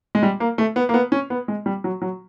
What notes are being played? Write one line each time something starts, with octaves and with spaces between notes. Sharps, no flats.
G#3
G3
A#3
A3
B3
A#3
B3
C#4
B3
G#3
G3
F#3
F#3